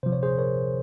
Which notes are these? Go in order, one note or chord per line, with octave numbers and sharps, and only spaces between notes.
C3 F3 C5
C#5
G#4 C5
A#4 C#5